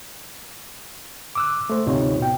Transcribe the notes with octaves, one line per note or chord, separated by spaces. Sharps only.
D6 E6 F#6
A3 C5
D2 G#2 C3 D#4 F4 C#5
B2 G5